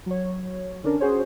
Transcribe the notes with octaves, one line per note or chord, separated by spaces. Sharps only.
F#3 C#5
D3 C#4 D4 A#4
C#4 F#4 G#4 C5 C#5